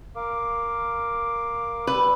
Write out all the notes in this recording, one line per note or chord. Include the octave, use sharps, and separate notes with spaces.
A#4 F5 D6
G3 B4 E6